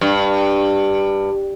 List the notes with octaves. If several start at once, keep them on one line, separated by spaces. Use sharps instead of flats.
G2